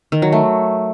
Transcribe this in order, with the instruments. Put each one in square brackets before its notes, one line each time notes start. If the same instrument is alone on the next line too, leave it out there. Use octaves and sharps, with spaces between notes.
[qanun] D#3
F#3
A3